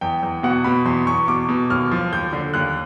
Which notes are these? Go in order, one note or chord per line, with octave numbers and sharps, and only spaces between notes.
E2 G5
E2
B2 F#5
B2 B5
E2 C6
E2 C#6
B2 D6
B2
D#2 F6
F3
D#2 G6
D3
D#2 F#6